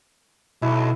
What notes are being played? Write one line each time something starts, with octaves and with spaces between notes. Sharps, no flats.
B1 E4